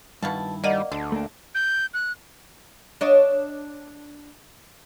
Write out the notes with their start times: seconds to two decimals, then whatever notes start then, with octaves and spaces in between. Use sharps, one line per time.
0.22 G2 B2 D#3 E4 F5 A5
0.64 G3 A#3 D5 D#5 F#5
0.92 D2 D3
1.12 A3 A#3 D4
1.55 G6
1.94 F#6
3.01 D4 C#5 D#5